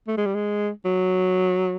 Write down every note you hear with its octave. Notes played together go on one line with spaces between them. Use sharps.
A3
G#3
G3
G#3
F#3